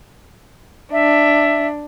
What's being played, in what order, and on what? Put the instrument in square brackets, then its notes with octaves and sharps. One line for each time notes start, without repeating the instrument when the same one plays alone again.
[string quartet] D4 [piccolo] E5